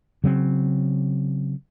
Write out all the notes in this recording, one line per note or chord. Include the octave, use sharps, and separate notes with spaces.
C#3 F#3 C4